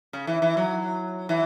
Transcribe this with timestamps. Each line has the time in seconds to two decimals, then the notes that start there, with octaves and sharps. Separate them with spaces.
0.13 C#3
0.27 E3
0.42 E3
0.57 F#3
1.29 E3